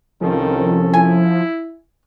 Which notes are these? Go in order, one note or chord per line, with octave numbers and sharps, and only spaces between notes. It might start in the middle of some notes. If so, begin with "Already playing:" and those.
C2 D#3 F3 C#4 A4
E4 G#5